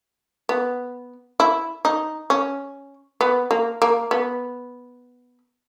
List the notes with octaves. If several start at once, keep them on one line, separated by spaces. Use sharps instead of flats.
B3
E4
D#4
C#4
B3
A#3
A#3
B3